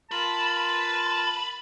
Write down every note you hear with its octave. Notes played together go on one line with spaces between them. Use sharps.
F4 A#4 B4 A5 C6